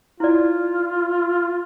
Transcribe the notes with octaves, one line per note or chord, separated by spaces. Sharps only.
E4 F4 D5